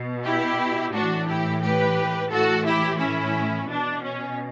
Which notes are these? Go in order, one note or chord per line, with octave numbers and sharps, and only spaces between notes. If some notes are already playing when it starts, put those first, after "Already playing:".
Already playing: B2
E4 G4
A2 E3 D4 F#4
E4 G4
G4 B4
A2 E3 F#4 A4
E4 G4
C#4 E4
B2 D4
C#4